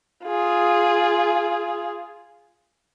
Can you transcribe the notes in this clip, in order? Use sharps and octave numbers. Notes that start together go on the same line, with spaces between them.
F4 G#4